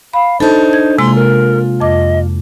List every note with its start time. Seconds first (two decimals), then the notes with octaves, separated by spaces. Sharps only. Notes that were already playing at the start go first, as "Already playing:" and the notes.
0.13 F5 B5
0.40 D4 D#4 A4 C5 A5
0.73 G#6
0.98 C3 G#3 A#3 F4 C6
1.15 A#4
1.80 F2 D#5 D6